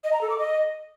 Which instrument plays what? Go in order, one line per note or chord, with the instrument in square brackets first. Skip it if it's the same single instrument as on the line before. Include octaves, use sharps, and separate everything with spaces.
[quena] D#5
A#5
A4
D6
D#5